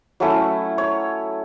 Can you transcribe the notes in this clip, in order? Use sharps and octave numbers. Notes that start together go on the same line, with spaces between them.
F#3 A3 C#4 E4 E5
C#5